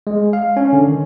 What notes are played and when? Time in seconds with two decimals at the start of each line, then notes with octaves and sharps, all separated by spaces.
0.07 G#3
0.33 F5
0.57 C#4
0.73 D3
0.88 D#3